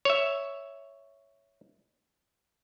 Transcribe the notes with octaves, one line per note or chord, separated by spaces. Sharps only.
C#5 E5